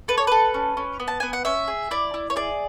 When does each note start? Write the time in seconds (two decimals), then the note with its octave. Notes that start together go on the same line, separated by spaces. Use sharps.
0.08 A4 B4
0.18 C#5
0.27 A4 B4
0.54 C#4
0.77 C#4
1.00 B3
1.08 A5
1.20 B3 G#5
1.33 F#5
1.45 C#4 E5
1.68 G#4
1.91 E4 D5
2.14 E4
2.30 C#5
2.36 G#4 D5